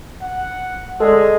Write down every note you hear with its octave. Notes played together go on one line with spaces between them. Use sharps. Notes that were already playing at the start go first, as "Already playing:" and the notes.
F#5
G#3 A4 D5